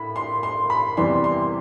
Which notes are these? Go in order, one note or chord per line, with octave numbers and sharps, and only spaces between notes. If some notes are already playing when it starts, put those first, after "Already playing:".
Already playing: A2 B5
C6
C6
B5
E2 C3 E3 G3 C6
C6